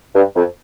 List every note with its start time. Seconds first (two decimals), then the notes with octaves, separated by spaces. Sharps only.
0.15 G2
0.36 F2